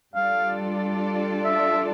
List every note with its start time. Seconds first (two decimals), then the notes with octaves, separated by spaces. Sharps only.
0.15 G3 D4 F4 A4 D5 F5
1.44 E5